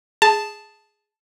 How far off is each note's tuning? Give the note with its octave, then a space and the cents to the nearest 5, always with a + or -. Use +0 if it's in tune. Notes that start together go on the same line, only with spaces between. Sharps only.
G#4 +0 A5 +0